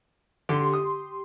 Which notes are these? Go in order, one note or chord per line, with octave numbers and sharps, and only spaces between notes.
D3 G4 C6
D#6